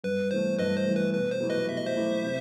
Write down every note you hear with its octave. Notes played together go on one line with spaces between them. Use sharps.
G2 B4
E3 A3 C5
G2 B4 D#5
C5
E3 A3
B4
B2 B4
C5
F#3 A3 E4 G4
B4 D#5
B2 E5
D#5
C5 E5
F#3 A3 E4 G4
C3